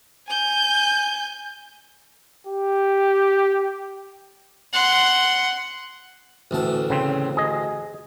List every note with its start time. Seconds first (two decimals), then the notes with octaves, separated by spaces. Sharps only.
0.28 G#5 G6
2.47 G4
4.73 F#5 C6
6.51 A1 D2 A5
6.90 C#3 C4
7.37 G#4 D#5